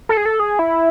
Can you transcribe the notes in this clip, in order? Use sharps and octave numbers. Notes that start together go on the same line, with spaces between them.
A4
G#4
A4
G#4
E4